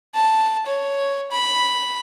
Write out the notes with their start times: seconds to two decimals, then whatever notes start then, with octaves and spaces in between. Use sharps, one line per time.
0.15 A5
0.66 C#5
1.31 B5